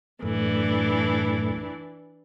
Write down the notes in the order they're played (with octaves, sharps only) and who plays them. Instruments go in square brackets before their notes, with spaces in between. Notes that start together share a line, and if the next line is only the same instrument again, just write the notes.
[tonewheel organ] F#2 A2 A3 [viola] E3 D4